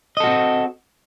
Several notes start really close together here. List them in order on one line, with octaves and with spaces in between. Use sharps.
D#5 A4 F#4 C4